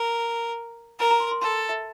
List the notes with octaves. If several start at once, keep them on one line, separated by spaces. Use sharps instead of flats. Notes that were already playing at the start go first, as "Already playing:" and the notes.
Already playing: A#4
A#4 A#5
A#5
C6
C6
A4 C6
E5